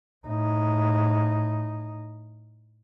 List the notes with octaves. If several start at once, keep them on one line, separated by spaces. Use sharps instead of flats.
A2 D#4